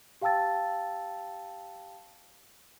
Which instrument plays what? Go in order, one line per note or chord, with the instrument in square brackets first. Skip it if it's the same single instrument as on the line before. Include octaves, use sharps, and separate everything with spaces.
[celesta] G4 F5 G5 A5 E6 A6